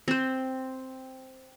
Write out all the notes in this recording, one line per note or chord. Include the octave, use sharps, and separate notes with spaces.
C4 C5